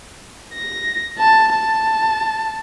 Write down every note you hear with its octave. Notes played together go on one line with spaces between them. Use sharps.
A#6
A5
A5